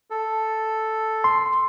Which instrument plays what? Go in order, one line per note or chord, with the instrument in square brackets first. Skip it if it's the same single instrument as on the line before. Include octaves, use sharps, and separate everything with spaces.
[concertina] A4
[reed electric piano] C6